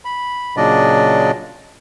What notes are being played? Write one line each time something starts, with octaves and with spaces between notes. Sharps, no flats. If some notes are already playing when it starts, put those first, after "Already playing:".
B5
A#2 C#3 F#3 D4 D5 D#5